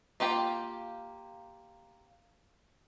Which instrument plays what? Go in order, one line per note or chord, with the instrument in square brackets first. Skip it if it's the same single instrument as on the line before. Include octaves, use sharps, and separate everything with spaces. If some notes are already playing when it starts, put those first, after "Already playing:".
[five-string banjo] A#3 F4 G4 G5